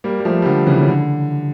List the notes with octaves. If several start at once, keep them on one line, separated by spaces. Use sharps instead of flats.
G3 A#3
G3
F3 A3
G3
D3 F3
C#3 E3
C#3
D3